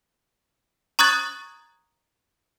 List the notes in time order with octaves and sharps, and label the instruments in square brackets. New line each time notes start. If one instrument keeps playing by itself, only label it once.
[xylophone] A#5 C#6 D#6 F#6 G#6 A6